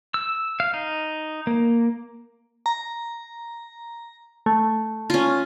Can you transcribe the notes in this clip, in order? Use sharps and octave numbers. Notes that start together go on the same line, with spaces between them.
E6
F5
D#4
A#3
A#5
A3
C#4 F4